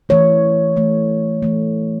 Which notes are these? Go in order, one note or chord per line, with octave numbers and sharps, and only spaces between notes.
E3 A3 C#5
E3 A3
E3 A3